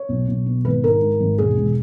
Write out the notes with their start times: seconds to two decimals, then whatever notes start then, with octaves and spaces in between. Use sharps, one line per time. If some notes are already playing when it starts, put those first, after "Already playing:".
Already playing: C#5
0.09 B1
0.28 B1
0.46 B2
0.65 G#1 B4
0.83 G#2 A#4
1.02 G#2
1.20 G#1
1.38 E1 G#4
1.57 E1